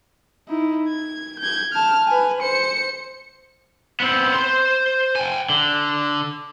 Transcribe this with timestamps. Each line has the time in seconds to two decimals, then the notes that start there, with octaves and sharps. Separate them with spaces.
0.49 D#4 E4
0.89 G#6
1.40 G6 G#6
1.73 A5 F6
2.07 B4 G#5
2.41 C5 C#7
4.00 B3 C4
4.35 C5 C6
5.16 G5 G#5
5.50 D3